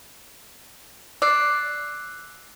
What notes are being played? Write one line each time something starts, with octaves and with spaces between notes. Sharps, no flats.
D5 E6 F#6 C7